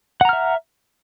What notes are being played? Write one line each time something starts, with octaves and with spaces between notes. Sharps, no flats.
E5 F#5 A#5 F6